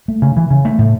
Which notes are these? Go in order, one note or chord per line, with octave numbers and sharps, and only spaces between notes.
A3
C#3
E3
C#3
A3
A2